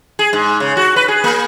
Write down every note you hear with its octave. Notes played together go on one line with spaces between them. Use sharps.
G#4
G#2
C#3
F#4
B4
G#4
A#3